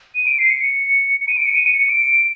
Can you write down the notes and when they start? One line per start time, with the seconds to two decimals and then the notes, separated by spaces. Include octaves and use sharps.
0.15 D#7
0.27 D7
0.39 C7
0.50 C#7
1.20 C#7
1.28 D#7
1.37 D7
1.46 C#7
1.55 D#7
1.66 C#7
1.78 C#7
1.90 D7